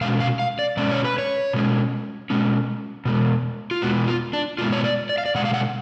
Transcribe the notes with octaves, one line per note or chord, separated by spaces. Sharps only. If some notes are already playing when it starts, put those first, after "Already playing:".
B2 G#3 C#4 F5
F5
F5
D5
B2 G#3 C#4 D5
C#5
B4
C#5
B2 G#3 C#4
B2 G#3 C#4
B2 G#3 B3
F4
B2 G#3 B3 F#4
F4
D4
B2 G#3 B3 F4
C#5
D5
D5
F5
D5
B2 G#3 F#5
F5
F#5